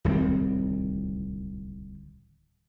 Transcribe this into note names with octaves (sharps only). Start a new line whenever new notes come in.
D1 C2 D#3 C4